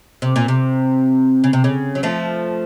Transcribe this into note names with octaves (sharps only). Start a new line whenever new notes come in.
C3
A#2
C3
C#3
C3
C#3
F#3
F3 A3